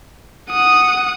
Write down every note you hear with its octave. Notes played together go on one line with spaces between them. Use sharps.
F#5 D#6